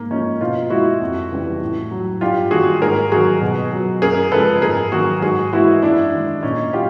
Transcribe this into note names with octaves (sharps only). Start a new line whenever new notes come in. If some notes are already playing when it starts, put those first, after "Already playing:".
Already playing: G#2 A#3
F3 G#3 C#4 D#4
B2 D#4 F4
G#3 E4 F#4
F2
C#3 E3 G3
A2
F#3
G2 F4 G4
D#3 G3 F#4 G#4
G#2 G#4 A#4
D#3 F#3 F#4 G#4
B2
F#3
F#2 G#4 A#4
C#3 F3 G#3 A4 B4
G#2 G#4 A#4
D#3 F#3 F#4 G#4
G#2 F#4 G#4
E3 G#3 E4 F#4
F#2 D4 E4
D#3 G#3
A#2 C#4 D#4
F#3 F4 G4